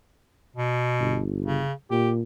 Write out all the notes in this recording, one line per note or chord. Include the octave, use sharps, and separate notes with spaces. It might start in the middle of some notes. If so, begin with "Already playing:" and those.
B2
G1
C#3
A#2 G4